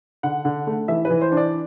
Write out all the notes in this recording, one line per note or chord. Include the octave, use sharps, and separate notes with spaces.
D3 F#5
D3
A3
E3 E5
B4
E3
C5
D4
D5